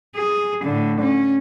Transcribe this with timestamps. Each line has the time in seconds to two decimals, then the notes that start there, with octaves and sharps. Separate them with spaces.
0.16 G#4
0.64 A2 D3
1.00 C#4